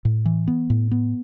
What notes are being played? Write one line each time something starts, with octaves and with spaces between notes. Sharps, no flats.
A2
E3
B3
A2
B3